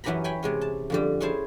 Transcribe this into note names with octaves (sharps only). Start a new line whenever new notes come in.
F#2 E3 C#4 G4 A#5 B5
C#5 G5 G#5 B5
C3 G#3 C#4
A5
F2 D3 G3
C#4 E4 G#4 C5 A5